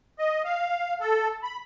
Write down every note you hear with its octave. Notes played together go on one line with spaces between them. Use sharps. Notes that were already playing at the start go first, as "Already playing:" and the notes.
D#5
F5
A4
B5